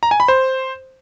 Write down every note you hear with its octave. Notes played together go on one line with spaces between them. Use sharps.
A#5
G#5
B5
C5